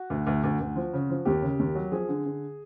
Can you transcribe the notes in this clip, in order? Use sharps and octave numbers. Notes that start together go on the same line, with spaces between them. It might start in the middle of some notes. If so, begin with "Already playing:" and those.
Already playing: F#4
D2
D2
D2
D2
F3
C#3
F3
D#2 G4
C#3
D#2
F#3
F3 G#4
D3
D3